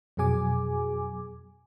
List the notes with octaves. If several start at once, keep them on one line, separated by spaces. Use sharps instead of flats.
F2 B2 F#3 G#4 G#5 D6